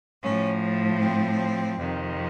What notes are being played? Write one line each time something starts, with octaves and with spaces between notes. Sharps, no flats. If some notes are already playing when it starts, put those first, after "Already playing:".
A2 F3 C#4
C4
F2 C3 D#3